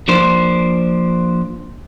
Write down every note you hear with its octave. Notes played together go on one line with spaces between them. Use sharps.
F3 A#3 D4 C5